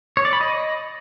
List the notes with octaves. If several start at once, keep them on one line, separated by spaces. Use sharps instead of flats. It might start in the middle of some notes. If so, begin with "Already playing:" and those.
C#5
D5
B5
D#5